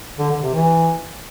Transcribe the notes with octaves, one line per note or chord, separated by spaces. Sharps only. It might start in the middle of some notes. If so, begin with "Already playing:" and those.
D3
D3
C3
E3